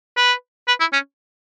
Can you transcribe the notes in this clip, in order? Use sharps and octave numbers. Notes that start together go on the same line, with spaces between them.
B4
B4
E4
C#4